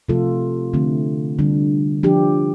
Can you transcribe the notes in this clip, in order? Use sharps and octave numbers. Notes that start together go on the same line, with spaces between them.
C3 F3 A3 F4 A4
D3 F3 A3 C4
D3 G3 D4
F3 D4 G4